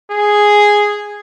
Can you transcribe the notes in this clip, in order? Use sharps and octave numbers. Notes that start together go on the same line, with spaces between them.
G#4